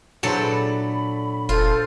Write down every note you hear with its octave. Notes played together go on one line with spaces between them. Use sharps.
A#2 F#3 D4 E4 A4 B4 C5
D5 B5
F1 F4 A4 C5